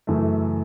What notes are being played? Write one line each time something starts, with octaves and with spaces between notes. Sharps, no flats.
F#2 C#3 E3 A3